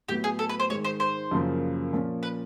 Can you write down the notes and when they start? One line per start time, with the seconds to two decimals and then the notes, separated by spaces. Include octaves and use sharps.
0.08 A2 F#3 B3 G4
0.24 G#4
0.39 A4
0.49 B4
0.60 C5
0.70 G#2 D#3 G#3 C#5
0.85 C5
1.00 C5
1.31 F#2 C#3 F3 A#3
1.93 A#2 F3 A#3 C#4
2.23 B4